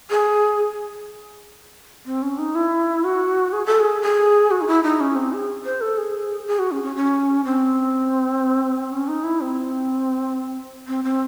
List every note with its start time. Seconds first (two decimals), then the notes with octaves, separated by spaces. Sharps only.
0.10 G#4
2.06 C4
2.22 C#4
2.38 D#4
2.55 E4
3.04 F#4
3.53 G#4
3.66 A4
3.80 G#4
4.02 G#4
4.51 F#4
4.61 D#4
4.67 E4
4.83 D#4
5.00 C#4
5.16 C4
5.33 G#4
5.65 C5
5.81 A4
5.98 G#4
6.47 G#4
6.59 F#4
6.72 C#4
6.83 C#4
6.96 C#4
7.45 C4
8.92 C#4
9.08 D#4
9.24 E4
9.41 C4
10.88 C4
11.04 C4